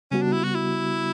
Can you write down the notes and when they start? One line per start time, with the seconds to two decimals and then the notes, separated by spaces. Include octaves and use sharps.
0.11 C#3 G3 B3 C#4 F#4
0.22 D4
0.32 E4
0.43 F#4
0.55 E4